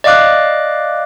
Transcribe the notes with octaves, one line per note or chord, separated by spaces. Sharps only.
D5 D#5 F5 D6 F#6